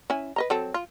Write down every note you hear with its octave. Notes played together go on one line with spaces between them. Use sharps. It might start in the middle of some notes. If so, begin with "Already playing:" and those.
C#4 E4 G#5
B4 D#5 A#5
F#3 C4 A4
F4